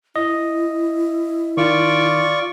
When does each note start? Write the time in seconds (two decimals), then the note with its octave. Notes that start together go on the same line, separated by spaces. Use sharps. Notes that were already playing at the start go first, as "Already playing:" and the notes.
0.16 E4 D#5
1.57 D#3 F4 D5 C#6